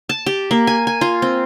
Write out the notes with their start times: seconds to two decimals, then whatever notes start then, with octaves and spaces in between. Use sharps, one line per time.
0.09 A5
0.26 G4
0.51 A#3
0.67 G#5
0.87 G#5
1.01 F4
1.22 C4